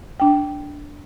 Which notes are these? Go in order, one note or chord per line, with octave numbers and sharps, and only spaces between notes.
D4 G5